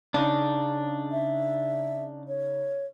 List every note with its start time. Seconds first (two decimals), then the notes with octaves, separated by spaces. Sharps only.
0.14 C#3 D4 D#4
1.12 E5
2.28 C#5